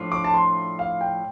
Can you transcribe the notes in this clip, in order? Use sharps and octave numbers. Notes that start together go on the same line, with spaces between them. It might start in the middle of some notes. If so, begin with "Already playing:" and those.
Already playing: A2 F3 D4 F4
D6
A5
C6
F5
G5